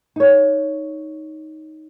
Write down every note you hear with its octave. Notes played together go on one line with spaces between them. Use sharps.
D#4 C#5